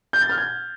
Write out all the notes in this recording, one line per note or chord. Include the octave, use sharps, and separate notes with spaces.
G6
A6
F6
G#6